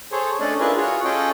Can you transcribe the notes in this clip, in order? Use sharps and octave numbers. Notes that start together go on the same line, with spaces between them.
G#4 A4 C5 C#5
A3 C#4 D4 A4 D5 D#5
D4 E4 F4 G#4 A#4 B4
F4 F#4 G#4 C#5
C#4 F4 G#4 A4 D#5 G5